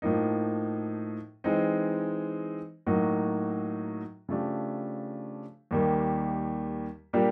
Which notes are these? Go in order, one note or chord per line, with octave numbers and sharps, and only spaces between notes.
A2 F3 A#3 D#4
E3 G#3 C4 D#4
A2 F#3 A#3 D#4 F#4
C#3 F3 A3 D4 G4
D#2 D#3 G3 A#3
A#2 G3 A#3 D4 G4